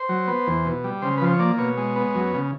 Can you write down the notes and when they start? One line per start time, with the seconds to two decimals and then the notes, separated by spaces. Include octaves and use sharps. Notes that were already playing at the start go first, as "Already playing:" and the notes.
Already playing: C5
0.09 F#3
0.27 B3
0.47 E2
0.65 B2
0.84 G3
1.02 C#3 C5
1.18 B4
1.21 F3 C5
1.33 C#5
1.39 A#3 D5
1.58 B2 C#5
1.77 G#3
1.96 B3
2.15 F#2
2.34 C#3